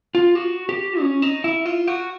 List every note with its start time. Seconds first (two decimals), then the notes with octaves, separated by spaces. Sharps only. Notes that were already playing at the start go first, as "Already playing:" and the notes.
0.15 F4
0.35 F#4
0.69 G4
1.00 C#4
1.22 D#4
1.44 E4
1.66 F4
1.87 F#4